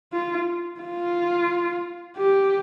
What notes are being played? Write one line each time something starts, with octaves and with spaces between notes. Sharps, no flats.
F4
F4
G4